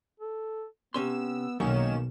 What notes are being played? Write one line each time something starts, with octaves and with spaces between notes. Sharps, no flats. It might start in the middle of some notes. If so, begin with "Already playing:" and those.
A4
C3 B3 C#4 C6 E6
B1 D#3 F#3 A#3 C#4 E7